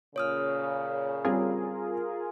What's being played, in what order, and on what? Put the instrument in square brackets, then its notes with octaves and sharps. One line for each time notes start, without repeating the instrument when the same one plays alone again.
[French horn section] A#2 C#3 [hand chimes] C#5 D#6 F6
[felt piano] G3 C4 [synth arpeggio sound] F4 G#4 A#4